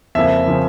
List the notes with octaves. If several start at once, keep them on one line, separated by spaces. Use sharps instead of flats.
F2 C#3 F3 A#3 E5
C#3 F3 A#3